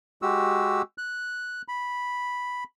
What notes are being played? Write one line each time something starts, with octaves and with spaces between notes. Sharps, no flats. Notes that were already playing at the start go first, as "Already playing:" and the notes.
G#3 F#4 G4 E6
F#6
B5